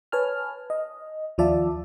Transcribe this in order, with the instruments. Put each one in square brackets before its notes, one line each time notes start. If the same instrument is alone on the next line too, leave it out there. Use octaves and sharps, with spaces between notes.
[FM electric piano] B4 C#5 G#5 A5 F6
D#5
D#2 F3 F4 D5 E5 A5